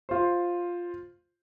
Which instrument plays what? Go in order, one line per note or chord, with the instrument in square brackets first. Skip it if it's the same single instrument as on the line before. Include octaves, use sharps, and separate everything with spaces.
[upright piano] F4 C5